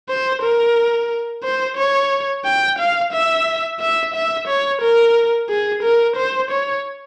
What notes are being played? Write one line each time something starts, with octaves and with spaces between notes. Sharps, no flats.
C5
A#4
C5
C#5
G5
F5
E5
E5
E5
C#5
A#4
G#4
A#4
C5
C#5